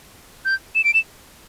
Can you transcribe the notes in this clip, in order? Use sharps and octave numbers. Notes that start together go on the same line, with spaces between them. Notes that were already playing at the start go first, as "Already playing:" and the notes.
G6
E7
D7
E7